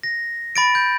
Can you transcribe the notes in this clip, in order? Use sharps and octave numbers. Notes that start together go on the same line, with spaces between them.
A#6
B5 A6 D7
G6